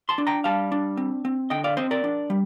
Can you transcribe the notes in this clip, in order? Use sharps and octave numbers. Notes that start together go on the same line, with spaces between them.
A5 C6
D4
G5 A#5
G3 F5 A5
D4
C4
C4
D3 D#5 G5
D5 F5
C4 C5 D#5
A#4 D5
D4
G3